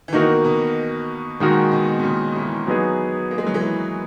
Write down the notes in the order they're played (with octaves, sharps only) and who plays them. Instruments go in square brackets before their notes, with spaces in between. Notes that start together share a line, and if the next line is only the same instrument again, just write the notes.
[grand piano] E3
[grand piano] B2 D#3 [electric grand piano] A#3 D#4 F#4 A#4
[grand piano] B2
[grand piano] A#2 [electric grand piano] D#3 G#3 D#4 F#4 A#4
[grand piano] B2
B2
A#2 C#3
C#3 E3
[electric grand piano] F#3 B3 D#4 G#4
[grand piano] A#3
G#3
F#3
E3 G#3